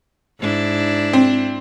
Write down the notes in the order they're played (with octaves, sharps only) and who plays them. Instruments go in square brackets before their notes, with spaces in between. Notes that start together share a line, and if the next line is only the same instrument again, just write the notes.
[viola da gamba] G#2 D4 E4
[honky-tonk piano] C4